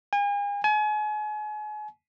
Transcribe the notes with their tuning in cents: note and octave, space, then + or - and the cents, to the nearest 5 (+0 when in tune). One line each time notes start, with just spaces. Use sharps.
G#5 -40
G#5 +35